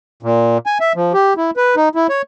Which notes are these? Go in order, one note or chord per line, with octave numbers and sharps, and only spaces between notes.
A#2
G#5
E5
F3
G4
E4
B4
D#4
E4
C#5